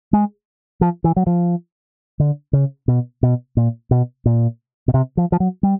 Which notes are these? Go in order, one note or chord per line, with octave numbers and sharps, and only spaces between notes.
G#3
F3
E3
F#3
F3
D3
C#3
B2
B2
A#2
B2
A#2
B2
C3
F3
F3
F#3
G3